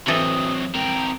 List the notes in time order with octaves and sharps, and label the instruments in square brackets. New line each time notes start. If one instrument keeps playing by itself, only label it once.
[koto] E3 A4 D#5 [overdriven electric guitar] F#3 C4 [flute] D#6
[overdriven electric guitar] C4 A#4 [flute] G5